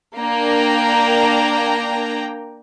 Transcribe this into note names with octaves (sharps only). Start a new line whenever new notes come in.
A#3 D4 G5 A#5